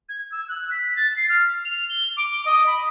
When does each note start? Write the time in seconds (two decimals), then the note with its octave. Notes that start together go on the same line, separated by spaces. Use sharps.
0.08 G#6
0.31 E6
0.48 F#6
0.71 B6
0.96 A6
1.16 C7
1.29 F6
1.64 F7
1.89 G7
2.16 D6
2.45 D#5
2.66 B5